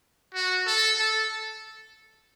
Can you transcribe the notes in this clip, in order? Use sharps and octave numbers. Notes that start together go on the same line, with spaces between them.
F#4
A4
A4